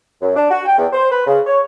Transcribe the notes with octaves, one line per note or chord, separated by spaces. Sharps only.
F#2
D4
F#4
G5
E2
C5
B4
C#3
C#5